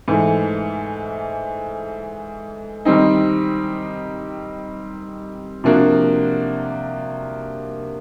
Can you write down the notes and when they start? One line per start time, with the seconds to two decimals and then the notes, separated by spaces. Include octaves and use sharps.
0.08 G#2 E3 A3
2.85 D#3 G3 C4 D#4
5.64 C3 F3 A#3 D4 F#4